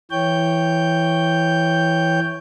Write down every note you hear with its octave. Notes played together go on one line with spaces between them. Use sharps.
E3 C#5 G5 G6